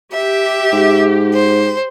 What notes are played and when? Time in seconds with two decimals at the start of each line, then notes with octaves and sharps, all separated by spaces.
0.13 G4 E5
0.72 G#2
1.34 C5